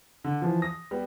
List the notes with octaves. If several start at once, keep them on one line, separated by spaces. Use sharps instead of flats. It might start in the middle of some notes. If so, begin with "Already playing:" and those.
D3
E3 F3
D#6 A#6
G3 B3